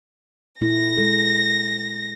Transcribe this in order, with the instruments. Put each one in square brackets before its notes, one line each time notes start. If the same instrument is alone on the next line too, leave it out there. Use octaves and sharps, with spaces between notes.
[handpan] A#2 A3 E4 [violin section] A#6
[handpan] G#3 A4